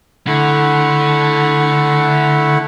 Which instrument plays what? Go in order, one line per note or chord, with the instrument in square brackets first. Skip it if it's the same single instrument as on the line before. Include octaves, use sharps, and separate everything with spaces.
[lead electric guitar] D3 [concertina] A3 E4 F#5